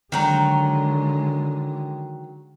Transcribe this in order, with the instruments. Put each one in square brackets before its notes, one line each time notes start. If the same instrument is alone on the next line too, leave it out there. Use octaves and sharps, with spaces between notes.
[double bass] D3 G#3 [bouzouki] D#3 F#3 A#5